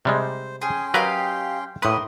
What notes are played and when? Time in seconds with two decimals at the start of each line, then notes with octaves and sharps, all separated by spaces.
0.05 C3 G3 G#3 C5
0.62 C#4 G#4 G5 C6
0.94 F#3 G4 A#4 B4 D#5 F5
1.82 A2 A#3 A#4 B4 B5 C6 D#6